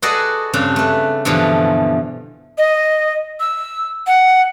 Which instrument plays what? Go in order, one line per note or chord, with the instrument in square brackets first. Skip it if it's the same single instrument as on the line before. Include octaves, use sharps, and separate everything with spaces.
[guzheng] F#4 G#4 A4 B4 D5 D#5
G2 C#3 C4 D4
A3 B4
G2 B2 D3 E3 F3
[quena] D#5
E6
F#5